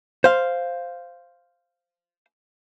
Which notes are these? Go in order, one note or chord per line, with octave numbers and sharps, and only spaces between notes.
C5 F5